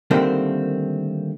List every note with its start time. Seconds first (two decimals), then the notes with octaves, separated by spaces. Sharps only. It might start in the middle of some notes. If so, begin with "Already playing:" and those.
0.11 D3 D#3 G3 A3 A#3 C4